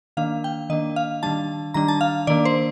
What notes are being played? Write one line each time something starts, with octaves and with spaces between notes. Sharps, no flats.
D#3 A#3 D4 F5
G5
D#3 A#3 D4 D#5
F5
D#3 G3 D4 A5
D#3 G3 D4 A#5
A5
F5
D#3 A#3 D4 D5
C5